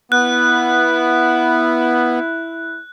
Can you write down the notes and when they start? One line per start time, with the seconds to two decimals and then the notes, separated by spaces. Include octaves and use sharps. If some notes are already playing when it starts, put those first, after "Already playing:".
0.12 B3 E4 F#6